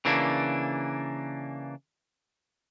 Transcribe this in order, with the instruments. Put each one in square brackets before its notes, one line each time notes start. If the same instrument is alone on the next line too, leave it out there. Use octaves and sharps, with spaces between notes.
[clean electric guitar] C#3 E3 A#3 D4